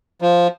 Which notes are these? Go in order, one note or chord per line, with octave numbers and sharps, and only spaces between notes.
F3